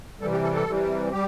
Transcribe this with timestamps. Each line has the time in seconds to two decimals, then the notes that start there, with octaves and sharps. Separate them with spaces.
0.20 C3 E3 G3 A4
0.32 G4
0.43 A4
0.54 A4
0.67 C3 E3 G3
1.12 G3 G4